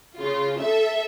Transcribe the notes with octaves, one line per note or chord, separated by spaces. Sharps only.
C#3 F4
A4 E5